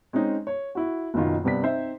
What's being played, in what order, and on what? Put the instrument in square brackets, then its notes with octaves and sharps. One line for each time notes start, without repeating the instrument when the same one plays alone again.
[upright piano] G#3 C4 C#4 D#4
C#5
E4 F#4
F#1 B2 D#3 F4
G2 C3 B3 D5 B6
C4 D#4 C5 E5